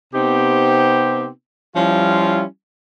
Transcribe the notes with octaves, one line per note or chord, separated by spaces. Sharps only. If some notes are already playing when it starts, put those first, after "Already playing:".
C3 B3 C4 D#4 G4
F3 G3 C#4 E4 F4